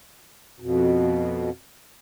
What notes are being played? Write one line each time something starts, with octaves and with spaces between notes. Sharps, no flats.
F2 B2